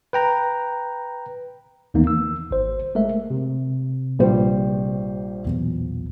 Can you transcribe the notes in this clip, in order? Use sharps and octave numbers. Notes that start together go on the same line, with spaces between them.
B4 G5 A#5
D#2 D#3 E3 A#3 B3 D#4
E6
G#1 C5
G#3 A3 A#4 E5
C3
A#1 G3 C5
B1 E2 A#2